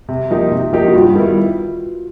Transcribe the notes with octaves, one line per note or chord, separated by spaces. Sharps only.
C3
F3 A#3 D#4 G4
C3
F3 A#3 D#4 G4
F#4
G2 F4
D#3 G3 B3 E4